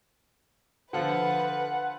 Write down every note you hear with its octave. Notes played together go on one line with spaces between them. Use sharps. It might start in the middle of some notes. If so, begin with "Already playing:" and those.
D3 F3 F4 B4 F#5